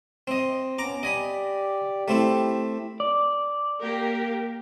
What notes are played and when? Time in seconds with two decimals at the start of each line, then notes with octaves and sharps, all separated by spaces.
0.27 C4 D#5
0.78 B3 C#4 A#5 D6
1.03 G4 D5 D#5 G#5 B5
2.08 A3 C4 E4 G4
3.00 D5
3.80 A#3 G4 A#4